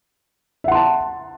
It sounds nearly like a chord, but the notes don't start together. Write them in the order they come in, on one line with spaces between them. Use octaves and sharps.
E5 F#5 C6 A5